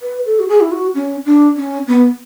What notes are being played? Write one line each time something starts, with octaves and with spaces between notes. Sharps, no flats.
B4
A4
F#4
G#4
E4
F#4
C#4
D4
C#4
B3